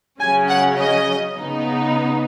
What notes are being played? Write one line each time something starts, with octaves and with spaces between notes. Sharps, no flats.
C#3 F#3 C#4 G#5
F#5
D#5
C#3 B3 D#4